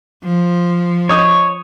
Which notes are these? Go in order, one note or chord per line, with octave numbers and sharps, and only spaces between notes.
F3
C#5 D#5 D#6 G6